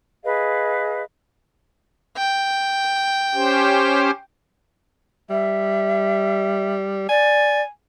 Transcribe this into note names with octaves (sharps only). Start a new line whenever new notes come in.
G#4 B4 D#5 F5
G5
C#4 G4 C5
G3 E5
D5 G#5